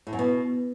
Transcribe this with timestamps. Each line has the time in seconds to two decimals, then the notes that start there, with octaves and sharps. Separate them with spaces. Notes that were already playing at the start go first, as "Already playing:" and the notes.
0.07 A2
0.13 F#2
0.19 B2